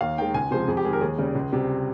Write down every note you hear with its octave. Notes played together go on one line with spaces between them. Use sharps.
D#2 F5
D#3 G#3 G5
C#2 G#5
C3 F3 G#3 C5
F2 G#4
G4
D#3 G#3 G#4
A#4
D#2 G#4
C#3 G3
C#2
C3 G3